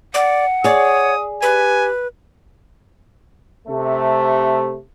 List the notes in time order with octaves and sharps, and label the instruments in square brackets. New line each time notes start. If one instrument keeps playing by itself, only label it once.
[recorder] D5 [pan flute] F#5
[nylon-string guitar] G#4 D5 [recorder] C#5 [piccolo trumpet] D#6
[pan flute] G4 [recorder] B4 [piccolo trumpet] G#5
[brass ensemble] C3 A3